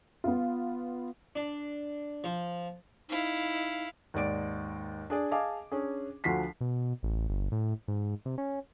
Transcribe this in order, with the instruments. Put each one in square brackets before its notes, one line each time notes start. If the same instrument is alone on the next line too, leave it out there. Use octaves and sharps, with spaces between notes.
[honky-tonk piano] B3 F4
[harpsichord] D4
F3
[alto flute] D#4 [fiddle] E4 F5
[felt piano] D#2 G#2 D5 D7
D4 G#4 D5
G#4 D#5 F5 G#5 A5 D6
C#4 D4 G#4
D2 D3 F3 F#4 B6 C7
[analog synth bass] B2
A1
G1
A2
G#2
C3
C#4